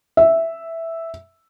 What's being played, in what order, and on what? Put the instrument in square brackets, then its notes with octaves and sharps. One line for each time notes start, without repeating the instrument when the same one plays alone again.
[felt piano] E5